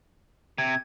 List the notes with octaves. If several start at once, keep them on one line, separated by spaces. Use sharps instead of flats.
C3 G#6